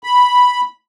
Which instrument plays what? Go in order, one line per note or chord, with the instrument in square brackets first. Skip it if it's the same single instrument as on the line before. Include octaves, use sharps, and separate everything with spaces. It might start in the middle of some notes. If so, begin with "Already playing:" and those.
[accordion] B5